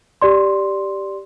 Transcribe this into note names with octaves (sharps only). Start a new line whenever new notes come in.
G4 D5 C6